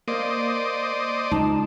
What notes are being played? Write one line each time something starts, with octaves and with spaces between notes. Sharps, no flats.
A#3 C5 D5 D#5
C#2 D#4 A5